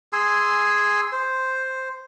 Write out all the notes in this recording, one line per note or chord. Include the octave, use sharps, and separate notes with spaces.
G#4 G#5 C6 E6
C5